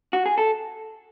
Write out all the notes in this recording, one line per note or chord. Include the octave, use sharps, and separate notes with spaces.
F#4
G#4
A4